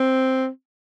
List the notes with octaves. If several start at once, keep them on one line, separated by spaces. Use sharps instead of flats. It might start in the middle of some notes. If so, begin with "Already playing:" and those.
Already playing: C4